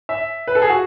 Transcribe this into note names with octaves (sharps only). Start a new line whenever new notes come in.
E5
B4
A4
G#4
F#4